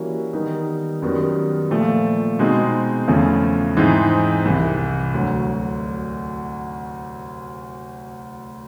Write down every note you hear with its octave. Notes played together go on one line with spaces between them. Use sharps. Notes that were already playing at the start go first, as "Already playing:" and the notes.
Already playing: E3 G3 A#3 C#4 F#4
D#3 G3 B3 D#4
F#2 D#3 G3 B3
A#2 F3 A3
B2 G#3 C4 D#4
E2 C#3 F3 A3
G#2 E3 G#3 C4 D#4
C2 C3 E3
D2 D3 F#3